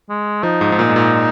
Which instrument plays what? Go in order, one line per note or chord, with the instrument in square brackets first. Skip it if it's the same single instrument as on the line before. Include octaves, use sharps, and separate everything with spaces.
[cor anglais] G#3
[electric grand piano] F3 [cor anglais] D#4
[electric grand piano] G#2
G#2
A#2
G#2
A#2